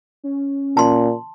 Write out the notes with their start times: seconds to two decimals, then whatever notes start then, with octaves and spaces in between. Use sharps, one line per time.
0.24 C#4
0.77 A#2 A5 C6